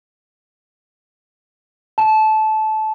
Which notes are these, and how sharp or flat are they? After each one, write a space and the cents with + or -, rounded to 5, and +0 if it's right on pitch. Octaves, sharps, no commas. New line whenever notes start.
A5 -20